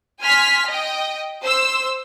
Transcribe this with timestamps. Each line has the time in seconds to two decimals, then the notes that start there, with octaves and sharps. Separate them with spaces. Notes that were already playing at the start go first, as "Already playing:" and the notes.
0.21 G#5 C6 F6 B6
0.67 D#5 G5
1.43 C5 E6